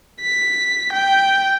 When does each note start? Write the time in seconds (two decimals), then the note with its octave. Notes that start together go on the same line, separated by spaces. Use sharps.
0.22 B6
0.93 G5